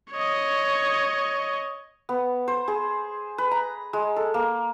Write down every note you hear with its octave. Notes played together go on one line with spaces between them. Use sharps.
C#5 D#5
B3
C5
G#4
B4
A#5
G#3
A4
A#3